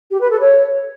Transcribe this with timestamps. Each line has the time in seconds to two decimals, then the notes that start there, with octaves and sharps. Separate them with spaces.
0.11 G4
0.21 B4
0.30 A4
0.40 C#5